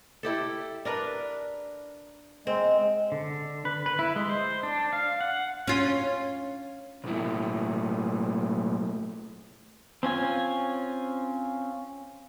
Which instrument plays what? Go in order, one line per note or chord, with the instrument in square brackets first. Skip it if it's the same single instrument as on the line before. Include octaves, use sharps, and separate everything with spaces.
[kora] E4 G4 A4
D4 A#4 B4
[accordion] G#3 [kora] C4
[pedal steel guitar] D3
B4
B4
E4
G#3
C5
D4
F5
F#5
[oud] C#4 F4
[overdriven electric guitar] B1 A2
[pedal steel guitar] C4 C#4 F4 G#5